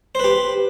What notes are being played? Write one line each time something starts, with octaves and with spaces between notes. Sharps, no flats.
G4 B4 C5